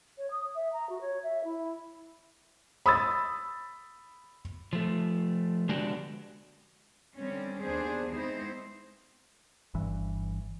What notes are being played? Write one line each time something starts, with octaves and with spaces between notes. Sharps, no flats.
C#5
D#6
E5
A#5
F#4
C#5
E5
E4
B5 D#6 E6 A6
F3 A3
D3 G#3 B3 D4 F#4 G4
D3 G3 C4 C#4
D#2 D#3 B3 D4 G#4 C5
G#3 B3 C4 D#4 E4 C5
G1 G2 E3